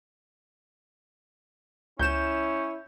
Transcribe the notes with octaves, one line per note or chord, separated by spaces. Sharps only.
C#2 C#4 E4 G6 E7